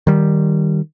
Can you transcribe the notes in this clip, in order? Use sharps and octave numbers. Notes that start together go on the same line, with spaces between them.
D#3 G3